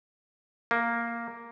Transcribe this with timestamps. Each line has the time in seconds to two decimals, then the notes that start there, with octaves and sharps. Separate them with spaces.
0.71 A#3